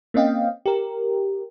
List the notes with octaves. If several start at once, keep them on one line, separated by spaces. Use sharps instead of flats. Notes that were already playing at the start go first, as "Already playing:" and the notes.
A#3 C4 C#4 D#5 F5 G5
G4 A#4